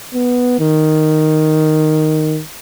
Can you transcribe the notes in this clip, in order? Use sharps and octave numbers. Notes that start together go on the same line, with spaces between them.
B3
D#3